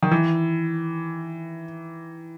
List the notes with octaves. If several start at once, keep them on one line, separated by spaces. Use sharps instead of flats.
D#3
E3